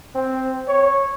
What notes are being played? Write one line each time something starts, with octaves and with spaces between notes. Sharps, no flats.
C4
C#5